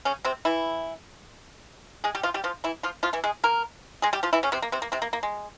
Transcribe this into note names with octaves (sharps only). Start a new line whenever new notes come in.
C#3 C#4
C3 C4
E3 E4
G#3 G#4
G3 G4
F3 F4
G3 G4
F3 F4
E3 E4
F3 F4
F3 F4
E3 E4
G#3 G#4
A#3 A#4
G#3 G#4
G3 G4
F3 F4
E3 E4
C#3 C#4
C3 C4
A#3
C3 C4
A#3
C3 C4
A#3
A#3
G#3